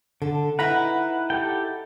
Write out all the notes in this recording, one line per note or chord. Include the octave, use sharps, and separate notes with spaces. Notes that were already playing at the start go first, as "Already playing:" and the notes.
D3 A4
D#4 E4 B4 F#5 A#5 B5
G4 A4 G5